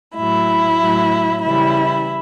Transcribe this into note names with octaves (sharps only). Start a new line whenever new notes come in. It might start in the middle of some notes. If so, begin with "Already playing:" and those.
A2 F#3 E4
A2 F#3
C#3 E3 G3 E4